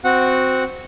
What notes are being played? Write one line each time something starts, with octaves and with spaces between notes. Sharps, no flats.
C4 F#4 F#5